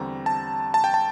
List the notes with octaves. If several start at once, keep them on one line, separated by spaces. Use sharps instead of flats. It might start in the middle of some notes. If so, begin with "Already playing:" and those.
Already playing: E2 D3 G3 C4 A#5
A5
A5
G5
A5